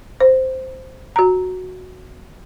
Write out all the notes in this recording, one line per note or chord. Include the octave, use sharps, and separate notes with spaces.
C5
F#4 A#5